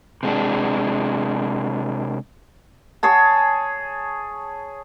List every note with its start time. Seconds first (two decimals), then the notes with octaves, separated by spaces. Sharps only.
0.23 C3 G#3 D4
3.03 G#4 C#5 A5